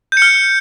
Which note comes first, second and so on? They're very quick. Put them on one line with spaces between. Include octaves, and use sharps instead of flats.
G6 C#7 F6